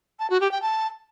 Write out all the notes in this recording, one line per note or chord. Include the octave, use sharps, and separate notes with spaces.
A5
F#4
G4
G5
A5